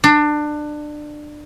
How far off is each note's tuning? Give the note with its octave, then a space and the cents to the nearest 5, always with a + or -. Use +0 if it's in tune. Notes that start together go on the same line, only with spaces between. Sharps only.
D4 +25